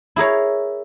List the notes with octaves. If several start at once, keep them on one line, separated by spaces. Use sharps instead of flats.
E4 G#4 A#4 C#5